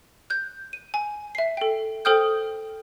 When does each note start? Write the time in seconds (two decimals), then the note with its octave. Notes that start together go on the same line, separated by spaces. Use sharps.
0.30 F#6 G6
0.73 D#7
0.94 G#5
1.35 E5 C7
1.57 A4 G5
2.05 A4 C5 G5 D#6 F6 G6